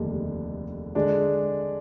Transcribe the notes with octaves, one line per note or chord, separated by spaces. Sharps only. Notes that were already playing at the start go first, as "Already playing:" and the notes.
Already playing: F1 D#2 D3 G#3 D4
D3 G#3 D4 G#4 D5